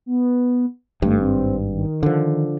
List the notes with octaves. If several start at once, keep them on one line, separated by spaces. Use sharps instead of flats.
B3
G#1 G2 A3
C4
D#3
D3 F3